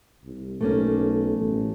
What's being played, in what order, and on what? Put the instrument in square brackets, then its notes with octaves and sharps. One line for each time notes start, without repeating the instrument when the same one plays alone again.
[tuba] C2
[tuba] B1 [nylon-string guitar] A3 A#3 C#4
[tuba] A1